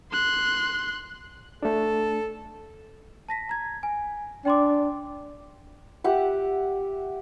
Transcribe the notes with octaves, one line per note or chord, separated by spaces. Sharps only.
C6 F#6
A3 D4 A4
A5 A#6 B6
A#5 G#6
G#5
D4 G5 C6 D6
G4 E5 F#5